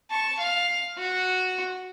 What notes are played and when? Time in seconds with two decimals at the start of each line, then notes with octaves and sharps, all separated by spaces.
0.11 A5 C#6
0.39 F5
0.98 F#4